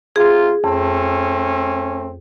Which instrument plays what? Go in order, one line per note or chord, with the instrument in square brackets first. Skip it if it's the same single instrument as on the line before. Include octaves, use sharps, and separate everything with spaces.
[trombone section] C3 F4 [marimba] G#4
[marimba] F2 [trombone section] A3 C4 C#4